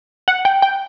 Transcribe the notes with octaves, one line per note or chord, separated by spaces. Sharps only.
F#5
G5
G5